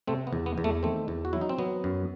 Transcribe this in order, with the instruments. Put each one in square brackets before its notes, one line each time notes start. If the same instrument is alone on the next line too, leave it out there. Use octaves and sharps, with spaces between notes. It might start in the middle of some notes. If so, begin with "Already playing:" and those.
[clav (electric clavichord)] C3 A3 C4
B3
E2
B3
E2
A3
D#3 A3 C4
E2
F#4
F#3 E4
D#4
C4
F#3 B3
F#2